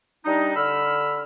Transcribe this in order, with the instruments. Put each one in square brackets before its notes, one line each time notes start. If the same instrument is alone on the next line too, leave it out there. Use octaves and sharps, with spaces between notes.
[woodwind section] G3 D4 D#4
D3 B5 E6 F6